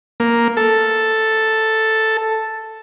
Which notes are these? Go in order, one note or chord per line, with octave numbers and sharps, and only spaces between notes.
A#3
A4